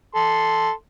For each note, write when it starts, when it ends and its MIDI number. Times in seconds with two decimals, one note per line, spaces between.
0.15 0.71 69
0.15 0.71 84